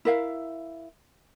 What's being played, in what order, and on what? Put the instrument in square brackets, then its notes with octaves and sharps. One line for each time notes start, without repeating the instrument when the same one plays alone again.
[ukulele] E4 A#4 E5 F5